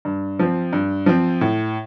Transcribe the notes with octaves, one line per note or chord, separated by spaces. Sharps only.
G2
F3 C4
G2
F3 C4
A2